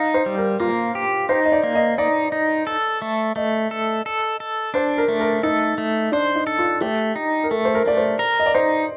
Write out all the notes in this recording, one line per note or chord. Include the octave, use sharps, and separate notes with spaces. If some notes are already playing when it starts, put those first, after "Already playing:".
Already playing: D#4 F5
C5
G3
A#4
A#3 F4
G4
D#4 C5
D#5
D5
A#3
D#5
D#4 D5
D#4
A4
A3
A3 D#5
A4
A4
A4
D4 C5
A#4
A3
A#4
D#4 A4
A3
D4 C5
D#4
A4
F4
A3 G4
D#4
A#4
A3 A4
C5
A#4
A3 D5
C5
A#4
D#5
D5
D#4 C5